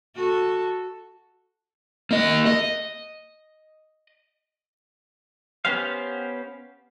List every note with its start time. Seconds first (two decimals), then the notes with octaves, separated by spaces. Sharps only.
0.16 F#4 A4
2.11 A#3 D#5
2.46 D#5
5.65 B3 C#4 G4 C5 F5